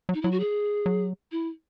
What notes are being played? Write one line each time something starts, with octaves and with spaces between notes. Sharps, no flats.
F#3
D#4
F#3 E4
F#4
G#4
F#3
E4